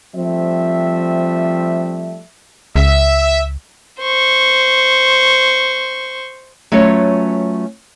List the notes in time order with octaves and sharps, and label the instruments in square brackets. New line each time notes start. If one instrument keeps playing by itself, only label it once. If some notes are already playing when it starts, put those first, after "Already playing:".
[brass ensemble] F3 G3 A3 C4 E5
[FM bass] C#2 [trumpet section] E5
[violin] C5 C#6
[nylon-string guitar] F#3 A3 C#4 F4 B4 C#5